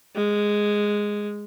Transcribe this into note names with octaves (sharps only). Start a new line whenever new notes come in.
G#3